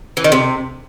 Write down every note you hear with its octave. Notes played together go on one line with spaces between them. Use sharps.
E3
D#3
C3